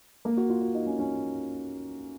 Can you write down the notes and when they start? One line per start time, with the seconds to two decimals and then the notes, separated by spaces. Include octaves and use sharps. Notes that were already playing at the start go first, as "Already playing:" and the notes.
0.25 A#3
0.37 F#4
0.50 F4
0.61 F4
0.74 D#4
0.86 C#4
0.99 C#4